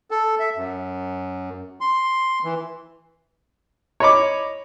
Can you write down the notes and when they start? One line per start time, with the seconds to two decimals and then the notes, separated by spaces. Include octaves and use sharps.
0.11 A4
0.39 E5
0.56 F#2
1.81 C6
2.44 E3
4.00 C#5 D#5 B5 D6